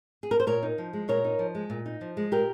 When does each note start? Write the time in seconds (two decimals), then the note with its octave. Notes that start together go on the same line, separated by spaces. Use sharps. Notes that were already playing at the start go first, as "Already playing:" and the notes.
0.23 G#4
0.31 A#4
0.40 C5
0.47 A#2 A#4 C#5
0.63 D#4
0.78 F3
0.93 G#3
1.08 A#2 A#4 C#5
1.24 D#4
1.39 F3
1.55 G#3
1.70 A#2
1.86 D#4
2.01 F3
2.17 G#3
2.32 A#2 G4 A#4